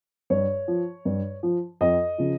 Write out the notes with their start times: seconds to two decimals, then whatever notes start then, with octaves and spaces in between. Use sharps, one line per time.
0.30 G2 C#5
0.68 F3
1.05 G2
1.43 F3
1.81 F2 D#5
2.18 C#3 F3